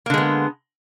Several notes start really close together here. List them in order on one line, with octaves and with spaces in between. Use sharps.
A#3 D3 G#3 B3